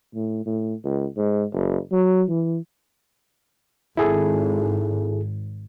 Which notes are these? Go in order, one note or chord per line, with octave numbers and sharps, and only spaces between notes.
A2
A2
C#2
G#2
F#1
F#3
E3
G#1 E4 G#4 A4